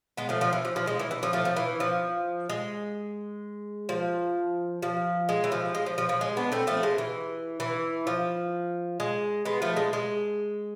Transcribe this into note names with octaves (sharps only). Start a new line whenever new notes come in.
G#3 B3
F3 A3
F3
E3
F3
F3
G#3
E3
E3
F3
F3 A3
F3
E3
F3
G#3
F3
F3
G#3
E3
F3
G#3
F3
F3
F3
G#3
B3 D4
A3 C4
F3 A3
G#3
E3
E3
F3
G#3
G#3 B3
F3 A3
G#3
G#3